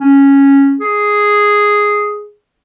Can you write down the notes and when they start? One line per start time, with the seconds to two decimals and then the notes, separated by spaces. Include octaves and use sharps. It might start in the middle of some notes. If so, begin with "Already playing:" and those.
0.01 C#4
0.80 G#4